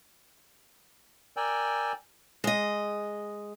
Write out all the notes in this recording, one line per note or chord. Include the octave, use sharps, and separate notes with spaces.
A#4 D5 G5 G#5 E6
G#3 D#5